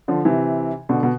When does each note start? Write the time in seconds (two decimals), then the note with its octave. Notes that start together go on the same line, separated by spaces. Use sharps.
0.08 D3 F3
0.25 C3 E3
0.89 B2 D3
1.03 B2